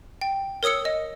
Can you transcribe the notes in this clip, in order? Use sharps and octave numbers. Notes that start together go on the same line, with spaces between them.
G5
A#4 C#5 D#6 E6 C#7
D#5